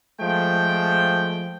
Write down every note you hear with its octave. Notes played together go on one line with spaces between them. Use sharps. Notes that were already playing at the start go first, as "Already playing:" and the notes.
F3 G#3 A3 G5